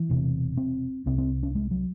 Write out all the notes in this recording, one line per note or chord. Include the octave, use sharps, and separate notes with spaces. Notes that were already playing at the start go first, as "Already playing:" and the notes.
Already playing: E3
E1 E2 C3
C4
C2 C3 C4
C4
C#4
G#3
F#3